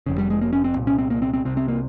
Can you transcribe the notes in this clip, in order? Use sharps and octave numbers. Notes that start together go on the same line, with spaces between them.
F1 F2 C#3
G3
G#3
A#3
C#4
C4
C2 A#2
C#4
C4
A#3
C4
C4
C2 C3 C4
C4
A#3